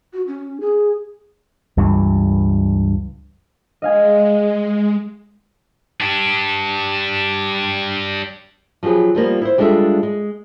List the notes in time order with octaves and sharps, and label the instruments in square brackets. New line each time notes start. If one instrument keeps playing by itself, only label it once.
[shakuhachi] F#4
C#4
G#4
[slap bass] C#2 G2 E3
[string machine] G#3 [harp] D#5 F5 G#5
[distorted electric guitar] D4 G4
[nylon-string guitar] F3 F#3 G4 G#4 B4
F3 G3 A#3 B3
E4 C5
G3 G#3 D4 F4 A4 E5
G#3